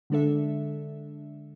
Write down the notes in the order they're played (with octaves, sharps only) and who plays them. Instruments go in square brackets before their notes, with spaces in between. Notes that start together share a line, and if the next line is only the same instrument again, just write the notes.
[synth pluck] D3 G#3 D4 A4 E5